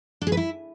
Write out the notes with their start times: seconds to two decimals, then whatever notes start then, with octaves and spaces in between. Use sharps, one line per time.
0.22 D4
0.27 G#4
0.32 B4
0.37 E4